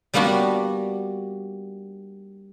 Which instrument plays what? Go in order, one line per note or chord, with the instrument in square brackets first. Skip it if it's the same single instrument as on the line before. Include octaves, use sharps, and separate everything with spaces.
[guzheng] G3 A#3 B3 D4 F#4